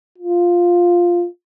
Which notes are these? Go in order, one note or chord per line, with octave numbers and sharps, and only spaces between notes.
F4